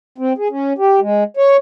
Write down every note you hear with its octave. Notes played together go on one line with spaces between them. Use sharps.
C4
G#4
C#4
G4
G#3
C#5